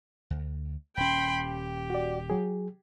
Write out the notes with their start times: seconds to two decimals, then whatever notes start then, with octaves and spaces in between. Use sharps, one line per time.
0.30 D2
0.97 D#1 C#4 G5 B5 C6
1.43 G4
1.90 F#4 D5
2.30 F#3 G#4